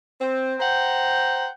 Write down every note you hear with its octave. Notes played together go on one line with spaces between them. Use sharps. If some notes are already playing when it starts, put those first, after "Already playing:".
C4
C5 F#5 G5 A#5